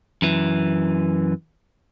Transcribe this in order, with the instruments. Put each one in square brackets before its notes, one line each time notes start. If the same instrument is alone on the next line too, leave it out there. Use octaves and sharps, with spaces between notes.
[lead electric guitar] F#2 E3